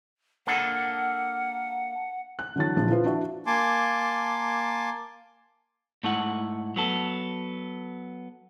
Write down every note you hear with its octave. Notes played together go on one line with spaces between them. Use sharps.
A#3 D4 A4 F#5
F#6
D3 E3 F#3 D4 A6
A#1 A#2 D4 F4
F3 E4 F4 B4
D4 E4 F#4 E5
A#3 G#5 A5 C6 D6
G#2 A3 E4 F#5
F#3 B3 A4